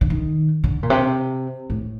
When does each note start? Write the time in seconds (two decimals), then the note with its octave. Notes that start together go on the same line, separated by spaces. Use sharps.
0.01 D3
0.10 D#3
0.64 D3
0.83 A#2
0.90 C3
1.70 A2